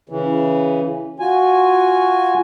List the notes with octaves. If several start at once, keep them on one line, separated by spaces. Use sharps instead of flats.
C#3 E3
F4 F#4 G#5